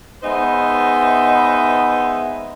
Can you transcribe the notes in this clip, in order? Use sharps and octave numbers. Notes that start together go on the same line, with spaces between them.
G#3 B3 D#4 C5 E5